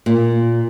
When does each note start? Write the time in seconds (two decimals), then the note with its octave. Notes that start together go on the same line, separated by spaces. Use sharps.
0.06 A#2